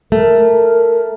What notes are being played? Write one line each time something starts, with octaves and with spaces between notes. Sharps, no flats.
A3 A#4